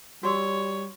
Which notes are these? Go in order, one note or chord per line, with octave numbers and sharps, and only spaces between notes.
G3 F#4 C#5 C6 E6